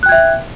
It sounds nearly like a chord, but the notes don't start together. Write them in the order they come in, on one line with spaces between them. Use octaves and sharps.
F#6 G5 G#6 E5